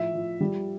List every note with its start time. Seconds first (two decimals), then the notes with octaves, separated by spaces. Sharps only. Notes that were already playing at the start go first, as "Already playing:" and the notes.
Already playing: A2 F3 E5
0.14 F3
0.41 G3